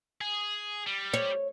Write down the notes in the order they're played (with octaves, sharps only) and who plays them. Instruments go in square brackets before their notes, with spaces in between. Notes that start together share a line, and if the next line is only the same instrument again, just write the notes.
[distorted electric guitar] G#4
G3
[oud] C#5